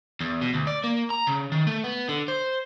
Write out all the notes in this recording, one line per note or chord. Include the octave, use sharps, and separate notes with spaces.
E2
B2
D2
D5
A#3
A#5
C#3
D#3
A3
B3
D3
C5